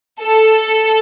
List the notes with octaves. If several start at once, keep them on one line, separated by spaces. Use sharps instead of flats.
A4